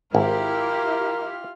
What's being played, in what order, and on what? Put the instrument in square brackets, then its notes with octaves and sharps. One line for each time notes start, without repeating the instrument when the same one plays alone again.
[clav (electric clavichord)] G#1 [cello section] E4 G4 [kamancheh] F4 F6 [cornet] A#4